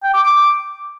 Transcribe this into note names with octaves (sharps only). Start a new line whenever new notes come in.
G5
D6
D6